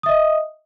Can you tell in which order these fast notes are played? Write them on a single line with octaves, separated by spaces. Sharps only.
D#6 E5 D#5